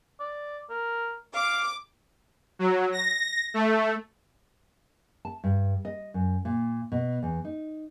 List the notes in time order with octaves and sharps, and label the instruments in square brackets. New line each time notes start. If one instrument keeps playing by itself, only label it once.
[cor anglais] D5
A#4
[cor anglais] F5 [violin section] D6
[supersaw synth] F#3
A#6
A3
[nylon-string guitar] A5
G2
D#5
F#2
A#2
B2
E2
D#4